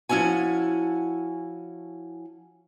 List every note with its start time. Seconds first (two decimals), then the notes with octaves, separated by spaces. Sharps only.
0.09 F3 C#4 E4 F#4 G#5